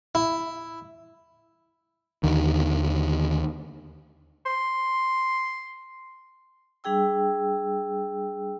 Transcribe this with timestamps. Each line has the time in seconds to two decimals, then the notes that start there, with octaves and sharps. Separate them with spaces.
0.15 E4
2.23 D#2 D3 D#3
4.46 C6
6.84 G3 D4 G#4 G5 E6